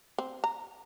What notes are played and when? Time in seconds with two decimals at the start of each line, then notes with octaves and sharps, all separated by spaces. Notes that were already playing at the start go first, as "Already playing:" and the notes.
0.18 C4
0.44 A#5